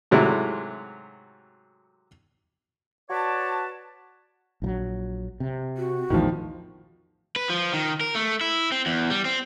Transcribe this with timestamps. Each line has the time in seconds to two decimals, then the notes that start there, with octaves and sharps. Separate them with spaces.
0.11 G#2 C3 F#3 A3 E4
3.10 F#4 B4 C#5 D5 A5
4.62 A#1 F3 F#3
5.40 C3
5.77 F#4
6.10 A#1 E2 A2 D#3 F3
7.36 B4
7.49 F3
7.73 D#3
8.01 A#4
8.15 A3
8.41 E4
8.72 C4
8.86 E2
9.10 G3
9.25 C4